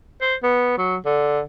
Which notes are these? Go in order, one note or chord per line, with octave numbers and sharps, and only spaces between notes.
C5
B3
F#3
D3